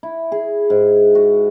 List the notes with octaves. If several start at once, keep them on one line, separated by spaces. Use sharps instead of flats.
E4
G#4
G#2
F#4